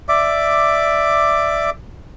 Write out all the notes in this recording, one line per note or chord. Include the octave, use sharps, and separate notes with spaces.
D5 E5 D6